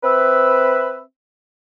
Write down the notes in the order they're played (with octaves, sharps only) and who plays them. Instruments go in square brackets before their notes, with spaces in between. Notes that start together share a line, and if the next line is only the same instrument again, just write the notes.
[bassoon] C4 [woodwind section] B4 E5